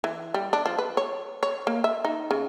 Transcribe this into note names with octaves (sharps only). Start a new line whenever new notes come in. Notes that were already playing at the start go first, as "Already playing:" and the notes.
E3
G3
D4
F3
B4
C#5
C#5
A#3
E5
D#4
C#3